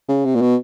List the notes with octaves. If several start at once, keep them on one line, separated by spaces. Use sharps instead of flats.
C#3
C3
A#2
B2